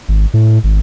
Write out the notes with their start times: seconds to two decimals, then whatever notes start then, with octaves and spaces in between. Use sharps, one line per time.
0.09 G#1
0.34 A2
0.64 G#1